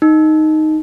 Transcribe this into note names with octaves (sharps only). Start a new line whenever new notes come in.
D#4